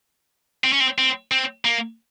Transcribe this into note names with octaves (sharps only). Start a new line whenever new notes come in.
C4
C#4
C4
C4
C4
A#3